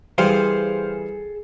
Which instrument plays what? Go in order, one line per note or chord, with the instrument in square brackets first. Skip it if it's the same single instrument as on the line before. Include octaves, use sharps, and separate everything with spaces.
[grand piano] E3 G3 [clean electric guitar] G#4 A4 G5 [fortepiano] C5 F5